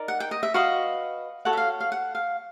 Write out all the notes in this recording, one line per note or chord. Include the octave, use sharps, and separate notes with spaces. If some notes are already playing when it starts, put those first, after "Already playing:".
Already playing: D#4 A#4 D5
F#5
G5
D#5
E5
F#4 B4 D#5 F5
F#4 A4 C#5 F#5
E5
F5
F5
F#5
F5